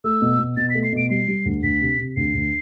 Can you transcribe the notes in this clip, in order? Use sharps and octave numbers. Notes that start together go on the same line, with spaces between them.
A3 E6
B2
B2
B2 A6
B6
A3
C7
B2 D7
G3 C7
G3
D2
D2 B6
C3
C3
D2 C7
D2